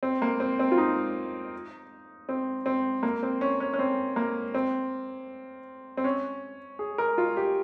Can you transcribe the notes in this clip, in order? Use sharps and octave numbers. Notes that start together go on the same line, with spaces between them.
C4
A#3
C4
C4
F4
D#4
C4
C4
A#3
C4
C#4
C#4
C#4
C4
A#3
C4
C4
C#4
G#4
A#4
F4
G4